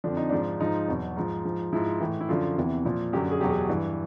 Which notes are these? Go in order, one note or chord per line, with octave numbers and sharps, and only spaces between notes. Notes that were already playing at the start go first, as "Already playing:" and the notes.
F2 D3 F3 D4
D#4
G#2 F3 D4
G#2 F3 D#4
E2 B2 F#3
G#2 F3
G#2 F3
G#2 F3 E4
A2 E3
E4
F#2 D3 F3 F4
E2 C3 E3
A#2 F3
F#2 D3 F#3 G4
G#4
E2 B2 F#3 G4
G#4
G2 E3